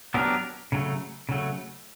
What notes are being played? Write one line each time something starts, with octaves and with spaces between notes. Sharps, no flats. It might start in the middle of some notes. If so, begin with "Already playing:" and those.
F#3 B3 D4 G4 A#4
C#3 F#3 A3
C#3 F#3 A3